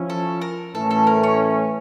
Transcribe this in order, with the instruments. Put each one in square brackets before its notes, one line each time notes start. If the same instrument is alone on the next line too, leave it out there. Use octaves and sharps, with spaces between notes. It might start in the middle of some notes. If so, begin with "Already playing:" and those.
Already playing: [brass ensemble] F3 C#4 E4
[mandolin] A4
A#4
[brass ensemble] A2 E3 A3 C#4 [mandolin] A4
[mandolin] A4
A#4
C#5